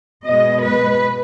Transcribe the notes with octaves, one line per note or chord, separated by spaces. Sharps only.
B2 G#3 D#5
B4